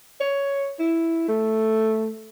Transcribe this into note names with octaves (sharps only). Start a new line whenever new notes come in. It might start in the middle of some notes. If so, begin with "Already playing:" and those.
C#5
E4
A3